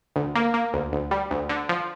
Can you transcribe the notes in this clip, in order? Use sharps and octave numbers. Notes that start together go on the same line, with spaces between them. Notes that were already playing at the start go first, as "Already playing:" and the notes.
D2
A#3
A#3
D2
D2
G3
D2
D3
F3